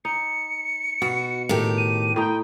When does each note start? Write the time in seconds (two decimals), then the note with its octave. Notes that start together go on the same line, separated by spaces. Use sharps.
0.05 D#4 C#7
1.02 B2 F#4
1.49 A2 D#3 G4
1.78 D#7
2.16 A2 D#4 G5